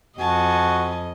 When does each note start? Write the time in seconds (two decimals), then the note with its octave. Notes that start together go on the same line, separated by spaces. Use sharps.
0.19 F2 F#4 D#5 G#5 A5